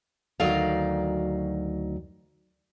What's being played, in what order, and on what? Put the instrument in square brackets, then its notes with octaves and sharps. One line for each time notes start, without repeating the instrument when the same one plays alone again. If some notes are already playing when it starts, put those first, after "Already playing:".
[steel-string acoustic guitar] D2 D#3 F#3 D#4 D5 F5